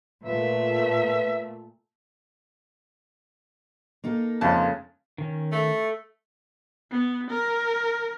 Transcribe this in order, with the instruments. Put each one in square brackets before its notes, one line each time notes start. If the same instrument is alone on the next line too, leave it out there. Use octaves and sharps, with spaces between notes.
[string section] A#2 A3 [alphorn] B4 [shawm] E5
[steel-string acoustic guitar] A#3 D#4 A4
[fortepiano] F2 A5 [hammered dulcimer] C#3 G#3
[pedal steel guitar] D#3 C#4
[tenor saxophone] A3
[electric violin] B3
A#4